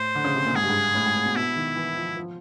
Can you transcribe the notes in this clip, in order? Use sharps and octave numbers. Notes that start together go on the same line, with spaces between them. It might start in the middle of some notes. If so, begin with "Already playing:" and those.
Already playing: A2 C5
D3
C#3
C3
A#2
G#2 G#4
G2
G#2
A2
G#2
A2
B2
B2 E4
D#3
E3
F3
F3